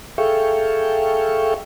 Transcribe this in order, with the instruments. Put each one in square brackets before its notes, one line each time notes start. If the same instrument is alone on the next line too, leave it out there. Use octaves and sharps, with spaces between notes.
[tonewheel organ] G#4 A4 E5 F5 G5 C#6